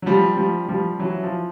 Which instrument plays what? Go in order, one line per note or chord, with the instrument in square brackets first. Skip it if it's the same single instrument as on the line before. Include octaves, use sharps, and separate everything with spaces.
[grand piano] F#3
F3 G3
F3 G3
F3 G3
E3 F#3
F3